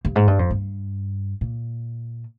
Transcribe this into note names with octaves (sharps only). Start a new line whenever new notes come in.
G2
G#2
G2
F2
G2
A#2